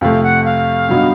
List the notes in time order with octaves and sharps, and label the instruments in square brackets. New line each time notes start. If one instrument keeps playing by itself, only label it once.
[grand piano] F2 C3 F3 A3 [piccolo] F5
[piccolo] F#5
F5
[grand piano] G2 D3 F#3 B3 D#4